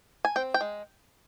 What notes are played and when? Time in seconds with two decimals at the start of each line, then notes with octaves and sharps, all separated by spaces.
0.25 G#5
0.36 C4 G5
0.54 G5
0.61 G#3